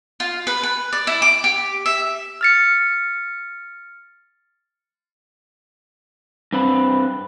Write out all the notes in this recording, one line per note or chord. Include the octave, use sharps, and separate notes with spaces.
F4
B4
B4
D5
E4
D6
G4
E5
F6 A6 C#7
G2 C4 B4